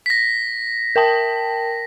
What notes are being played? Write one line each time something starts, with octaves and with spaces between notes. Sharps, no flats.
A#6 B6
A#4 G5 A5